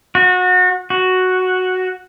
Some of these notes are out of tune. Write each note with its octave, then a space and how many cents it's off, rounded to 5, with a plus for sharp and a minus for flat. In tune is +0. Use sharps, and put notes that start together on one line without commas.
F#4 -25
F#4 +0